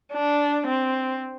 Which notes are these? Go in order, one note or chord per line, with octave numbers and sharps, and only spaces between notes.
D4
C4